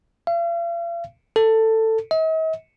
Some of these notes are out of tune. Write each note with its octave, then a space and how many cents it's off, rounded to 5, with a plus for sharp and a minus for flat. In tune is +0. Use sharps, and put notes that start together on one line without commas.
F5 -45
A4 +15
D#5 +45